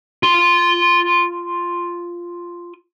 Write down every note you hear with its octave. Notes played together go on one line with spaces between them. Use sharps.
F4 C6